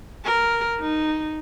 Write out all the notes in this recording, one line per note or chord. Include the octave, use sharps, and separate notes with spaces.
A#4
D#4